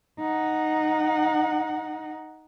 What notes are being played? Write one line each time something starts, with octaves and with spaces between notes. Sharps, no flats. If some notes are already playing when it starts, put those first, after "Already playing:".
D#4 F#5